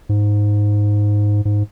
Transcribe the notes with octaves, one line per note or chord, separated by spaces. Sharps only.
G#2
G#2